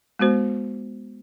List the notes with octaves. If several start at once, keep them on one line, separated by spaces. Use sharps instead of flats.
G#3 B3 F#4 C5